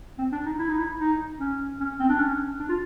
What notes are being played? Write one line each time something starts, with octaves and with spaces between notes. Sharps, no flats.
C4
D4
D#4
E4
D#4
E4
D#4
C#4
C#4
C4
D4
C#4
D4
F4